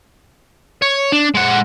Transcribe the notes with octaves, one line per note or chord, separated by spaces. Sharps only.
C#5
D4
G#3 F#5